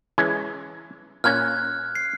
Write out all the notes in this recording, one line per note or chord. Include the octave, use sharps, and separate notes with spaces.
E3 G#3 C#4
A#2 A#3 C#4 F6 F#6 G#6
C7